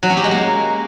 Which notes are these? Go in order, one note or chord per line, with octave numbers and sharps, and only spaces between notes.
F#3
C#4
G4
G#3
A#3